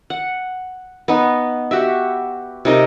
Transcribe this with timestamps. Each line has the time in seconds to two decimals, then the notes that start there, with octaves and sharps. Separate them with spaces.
0.10 F#5
1.08 B3 D#4
1.71 F#4 G4 E5
2.65 C3 D#4 A#4 D#5